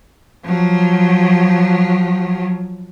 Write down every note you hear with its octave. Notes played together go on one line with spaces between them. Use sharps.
F3 F#3